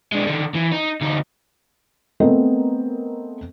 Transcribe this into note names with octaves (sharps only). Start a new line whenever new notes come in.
G#3 D4
D3 D#3
E3
D#4
D2 D#4
A3 B3 C4 A4 A#4 D#5